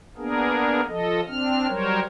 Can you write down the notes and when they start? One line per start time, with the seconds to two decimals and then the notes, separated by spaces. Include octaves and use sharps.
0.17 A#3 B3 D4 G#4 A#4
0.88 F3 A4 D#5
1.27 C4 D4 F6
1.67 F#3 G3 A#4 C5 C#5